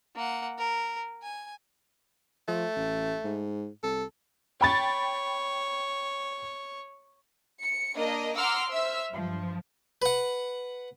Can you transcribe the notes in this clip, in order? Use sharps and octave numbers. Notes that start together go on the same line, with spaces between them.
A#3 F#5
A#4
G#5
F3 A3
A1
G#2
C2 A4
C#5 G5 B5 A6
C#7
A#3 D4 A#4 D#5
F#5 A#5 C6 D6 E6 F6
C5 E5 E6 F6
G2 F3
B4 F#5